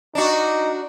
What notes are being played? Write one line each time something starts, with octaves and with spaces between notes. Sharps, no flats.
D4 D#4 F#4